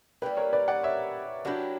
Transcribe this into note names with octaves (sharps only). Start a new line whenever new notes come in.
G3 A#3 E4 G4 B4
A#4 C#5
B4 D5
D5 F#5
C#5 E5
F#3 A#3 D4 E4 F#4 G4